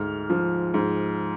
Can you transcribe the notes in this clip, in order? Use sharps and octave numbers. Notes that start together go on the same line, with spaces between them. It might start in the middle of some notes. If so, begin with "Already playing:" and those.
Already playing: D2 G#2 F6
F3
G#2